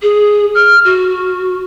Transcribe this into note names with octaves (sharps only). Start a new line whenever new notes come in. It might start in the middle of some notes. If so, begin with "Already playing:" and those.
G#4
F6
F#4